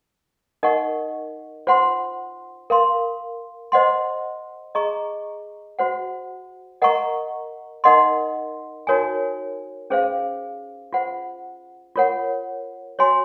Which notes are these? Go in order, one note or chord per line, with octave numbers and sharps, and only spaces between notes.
D#4 A#4 D#5 F#5 C#6
F4 C5 F#5 C6
A#4 F5 C6
C5 D#5 F#5 C6
G#4 D#5 A#5 C#6
F#4 C5 F#5
A#4 D#5 F#5 A#5 C#6
D#4 A#4 D#5 F#5 C6
D#4 F#4 A#4 C#5 G#5
C#4 G#4 C5 F5
F4 C5 F#5
F4 A#4 C#5 F#5
F#4 C#5 G#5 C6